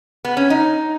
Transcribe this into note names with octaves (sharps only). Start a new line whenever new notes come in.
B3
C#4
D#4